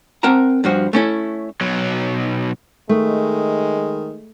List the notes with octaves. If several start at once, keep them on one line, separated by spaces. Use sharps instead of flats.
C4 A#4 F#5 A5 A#5
G2 F3 F#4
A3 C#4 E4
B1 F#3
D#3 G#3 A3